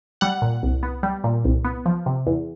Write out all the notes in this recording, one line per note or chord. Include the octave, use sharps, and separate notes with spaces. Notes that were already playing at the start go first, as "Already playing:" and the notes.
G3 F#5
A#2
C2
B3
G3
A#2
C2
B3
F3
C3
E2